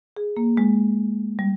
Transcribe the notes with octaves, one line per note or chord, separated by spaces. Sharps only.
G#4
A#3
G#3
G3